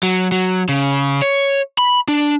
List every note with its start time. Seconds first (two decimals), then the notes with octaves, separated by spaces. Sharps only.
0.03 F#3
0.32 F#3
0.69 C#3
1.22 C#5
1.78 B5
2.08 D4